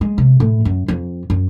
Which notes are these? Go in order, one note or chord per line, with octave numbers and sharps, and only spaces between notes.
G#3
C3
A2
F#2
F2
F#2